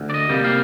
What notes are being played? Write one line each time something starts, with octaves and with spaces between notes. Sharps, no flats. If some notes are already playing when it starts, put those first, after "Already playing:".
Already playing: D2
D5
D#5
C3 G3 A#3
F5